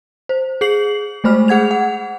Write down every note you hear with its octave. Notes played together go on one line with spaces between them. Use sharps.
C5
G#4 C7 F#7
G#3 A3 C5 B5 F6
G#4 F#5 G#6 F7
F#5